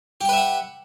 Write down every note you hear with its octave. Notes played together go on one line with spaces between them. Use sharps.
G4 B4 E5 F#5 G5